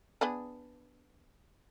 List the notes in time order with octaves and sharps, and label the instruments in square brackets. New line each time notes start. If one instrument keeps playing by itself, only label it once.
[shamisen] B3 D4 G#4